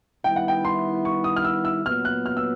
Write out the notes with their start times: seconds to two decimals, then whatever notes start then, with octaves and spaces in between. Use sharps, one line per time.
0.24 D#3 G3 B3 E4 G5
0.36 F#5
0.48 G5
0.65 C6
1.05 C#6
1.24 D#6
1.36 F6
1.44 E6
1.65 E6
1.85 A#2 F#3 B3 F6
2.05 F#6
2.26 F6
2.37 E6